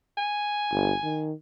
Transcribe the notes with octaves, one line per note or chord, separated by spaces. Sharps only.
G#5
G1
D#3